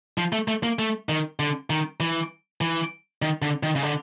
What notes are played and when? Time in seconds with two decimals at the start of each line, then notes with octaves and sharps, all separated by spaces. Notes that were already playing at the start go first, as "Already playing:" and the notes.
0.18 F3
0.33 A3
0.48 A3
0.63 A#3
0.79 A3
1.09 D#3
1.40 D3
1.70 D#3
2.00 E3
2.61 E3
3.22 D#3
3.42 D3
3.63 D#3
3.76 C#3
3.83 D3